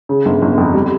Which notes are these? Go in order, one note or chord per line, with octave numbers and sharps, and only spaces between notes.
C#3
G1
G1
F2
G3